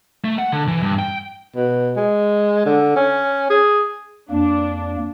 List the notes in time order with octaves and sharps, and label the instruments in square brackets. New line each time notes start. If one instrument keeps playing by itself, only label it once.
[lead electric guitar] A3
F#5
D3
E3
G2
G5
[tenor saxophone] B2
G#3
D3
C#4
G#4
[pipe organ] F2 A#3 [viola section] D4